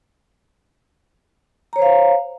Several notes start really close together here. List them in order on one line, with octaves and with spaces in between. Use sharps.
A#5 C#5 C5 F5